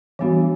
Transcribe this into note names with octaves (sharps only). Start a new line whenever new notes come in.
E3 G3 B3 D4 F#4